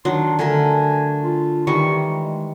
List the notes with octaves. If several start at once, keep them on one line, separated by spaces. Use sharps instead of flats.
D#3 F#3 D4 C6
D3 A3 A#4 G#5
F4
D#3 E3 G3 C#6
G#3